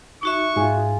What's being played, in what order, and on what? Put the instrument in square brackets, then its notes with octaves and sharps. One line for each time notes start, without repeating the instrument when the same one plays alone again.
[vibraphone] D#4 F#4 E5 [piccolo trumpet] C#6
[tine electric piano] G#2 [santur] F4 G#4